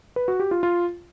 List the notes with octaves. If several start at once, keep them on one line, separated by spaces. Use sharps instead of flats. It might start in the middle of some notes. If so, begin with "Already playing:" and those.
B4
F#4
G4
F4
F4